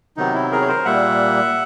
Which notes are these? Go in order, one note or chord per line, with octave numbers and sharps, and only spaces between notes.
C3 D#3 F#3 B3 D#4
E4
G#4 A#4
C#5
A#4 C5
A#2 G3 A#3 E5 F#5